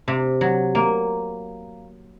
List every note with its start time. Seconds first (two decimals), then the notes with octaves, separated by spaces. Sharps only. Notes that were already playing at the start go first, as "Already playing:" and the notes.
0.08 C3
0.41 F#3
0.75 A#3